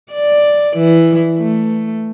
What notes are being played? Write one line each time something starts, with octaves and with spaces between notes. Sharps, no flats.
D5
E3
A3